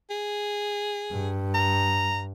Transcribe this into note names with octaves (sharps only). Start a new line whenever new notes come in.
G#4
G2
A#5